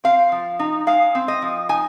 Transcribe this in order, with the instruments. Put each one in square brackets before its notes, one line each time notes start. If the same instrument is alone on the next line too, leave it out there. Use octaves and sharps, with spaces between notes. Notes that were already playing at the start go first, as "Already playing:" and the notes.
[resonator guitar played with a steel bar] C4 F5
F3
D#4
G#3 F5
C4
D#5
F3
D#4 G#5